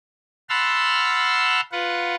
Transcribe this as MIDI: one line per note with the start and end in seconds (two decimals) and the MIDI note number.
0.50 1.61 78
0.50 1.61 81
0.50 1.61 83
0.50 1.61 84
0.50 1.61 88
0.50 1.61 89
1.72 2.15 65
1.72 2.15 71
1.72 2.15 78